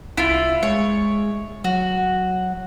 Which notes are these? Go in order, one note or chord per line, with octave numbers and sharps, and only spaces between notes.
C2 E4 F4
G#3 C#5
F#3 F#4